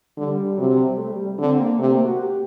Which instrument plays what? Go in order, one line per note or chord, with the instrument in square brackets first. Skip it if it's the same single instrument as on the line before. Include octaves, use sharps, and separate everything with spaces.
[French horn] D3 [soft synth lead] G3
[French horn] C3 [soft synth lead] F#3
[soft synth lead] G3
A3
G3
[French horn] D3 [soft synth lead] C4
[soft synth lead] A#3
[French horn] C3 [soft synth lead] A3
[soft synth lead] A#3
F#4
G4